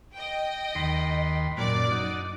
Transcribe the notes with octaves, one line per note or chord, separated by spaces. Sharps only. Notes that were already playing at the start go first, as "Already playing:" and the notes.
D#5 G5
D#2 B5 C6
F#2 A#2 F#3 D5 D6
D#4 F#5